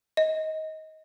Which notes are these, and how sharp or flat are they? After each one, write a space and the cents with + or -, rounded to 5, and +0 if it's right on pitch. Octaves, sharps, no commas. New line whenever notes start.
D#5 +20